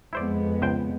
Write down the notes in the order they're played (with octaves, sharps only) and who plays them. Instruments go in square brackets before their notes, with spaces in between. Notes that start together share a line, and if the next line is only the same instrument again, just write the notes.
[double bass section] F2 G#3 B3 [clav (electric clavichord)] E4 C5 D5
[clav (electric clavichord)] C#2 C5 G5